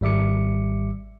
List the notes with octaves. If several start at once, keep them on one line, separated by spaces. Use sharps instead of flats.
G#1 G3 E5 D6 C#7